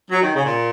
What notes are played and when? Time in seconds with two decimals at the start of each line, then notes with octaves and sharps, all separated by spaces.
0.10 F#3
0.21 D#3
0.33 C#3
0.45 A#2